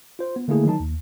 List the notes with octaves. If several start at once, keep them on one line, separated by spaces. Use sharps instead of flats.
F4 C5
B3
D3 A3 A#3 E4 G#4
D#3 F#3 D#4 A5
D#2